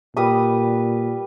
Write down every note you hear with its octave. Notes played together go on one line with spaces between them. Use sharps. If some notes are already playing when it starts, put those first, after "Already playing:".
A#2 G3 B4 D#6